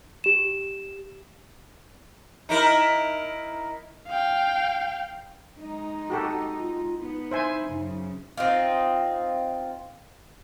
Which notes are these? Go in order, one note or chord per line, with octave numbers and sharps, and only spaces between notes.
G4 E7
D#4 E4 A#4
F5 G5
G#3 D#4
F#4 G4 A4
F4
B3 D#4
E4 C5 E5 G#5
F#2 C#3
C4 D#4 F4